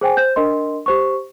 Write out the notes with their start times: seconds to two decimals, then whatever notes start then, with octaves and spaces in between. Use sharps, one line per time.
0.01 G#4 C5 G5 G#5
0.17 C5 G6
0.36 D4 A#4 D#5 C6
0.86 G4 C5 C#6